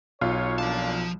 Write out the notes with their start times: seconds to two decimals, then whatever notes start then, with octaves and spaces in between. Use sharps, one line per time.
0.21 B1 F4 C#5
0.59 F3 A#3 C#4 D4 A5